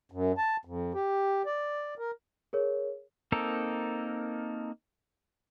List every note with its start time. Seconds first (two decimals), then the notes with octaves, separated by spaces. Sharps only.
0.12 F#2
0.38 A5
0.65 F2
0.94 G4
1.46 D5
1.99 A#4
2.53 G#4 A#4 C#5
3.32 A#3 C4 D#4 A4 A#4